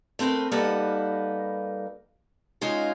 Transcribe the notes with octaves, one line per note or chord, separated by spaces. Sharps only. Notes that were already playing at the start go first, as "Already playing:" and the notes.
A3 C4 A#4 B4
G3 A#3 D#4 A4 B4 F#5
G#3 C#4 D#4 F4 F#4